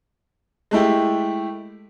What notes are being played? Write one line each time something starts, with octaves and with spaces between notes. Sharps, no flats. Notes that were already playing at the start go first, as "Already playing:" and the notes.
G#3 A3 E4 G4